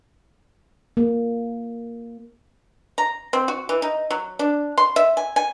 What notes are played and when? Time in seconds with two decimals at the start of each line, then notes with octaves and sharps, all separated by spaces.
0.97 A#3
2.98 A#5
3.33 C4
3.48 F#4
3.69 E3
3.82 D#4
4.11 F#3
4.39 D4
4.78 C6
4.96 E5
5.17 G#5
5.36 G#5